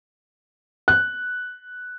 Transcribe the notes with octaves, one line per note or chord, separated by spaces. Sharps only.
F#6